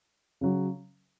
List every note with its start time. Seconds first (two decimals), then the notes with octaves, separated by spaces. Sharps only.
0.41 C#3 F#3